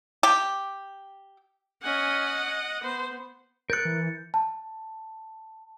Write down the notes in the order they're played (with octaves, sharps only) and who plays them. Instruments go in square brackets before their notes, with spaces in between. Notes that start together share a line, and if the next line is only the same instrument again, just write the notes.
[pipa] G4
[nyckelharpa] C#4 G#5 [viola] D#5 F#5
[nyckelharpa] B3 [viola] C5
[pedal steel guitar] A#4 F#6 [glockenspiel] G6 A6 C#7
[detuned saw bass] E3
[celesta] A5